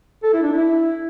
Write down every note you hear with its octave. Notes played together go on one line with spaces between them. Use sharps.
A4
E4
D4
E4